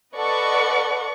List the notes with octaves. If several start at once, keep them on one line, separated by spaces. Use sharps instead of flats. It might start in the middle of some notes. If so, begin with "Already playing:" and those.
A4 B4 D5 D#5 F#5 C#6